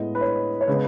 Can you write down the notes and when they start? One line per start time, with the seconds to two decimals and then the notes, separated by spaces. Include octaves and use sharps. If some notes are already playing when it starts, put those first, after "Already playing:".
Already playing: A2 G#3 B3 D#5
0.15 B4
0.21 C#5
0.61 C#5
0.67 C#3 G#3 B3 B4